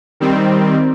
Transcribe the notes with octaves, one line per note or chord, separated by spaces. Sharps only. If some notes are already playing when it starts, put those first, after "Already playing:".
D#3 G3 C4